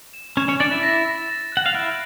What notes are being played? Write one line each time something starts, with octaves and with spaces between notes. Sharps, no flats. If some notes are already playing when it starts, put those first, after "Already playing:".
E7
C#4 C#5 E7
C#4 C#5
D4 D5 A6
E4 E5
A#6
A#6
A#6
F#5 F#6
F5
E4 E5 D7